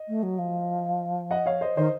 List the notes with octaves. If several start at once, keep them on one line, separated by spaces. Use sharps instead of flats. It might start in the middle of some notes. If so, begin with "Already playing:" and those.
Already playing: D#5
A3
F#3
F3
D#5 F#5
C#5 F5
C5 D#5
D#3 C5 D#5